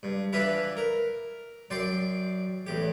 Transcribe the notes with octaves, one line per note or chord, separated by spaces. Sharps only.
G2
E3 D4 F4 B4 E5 B5
A#4
F#2 D5 G5 C6 D6
A1 E2 G4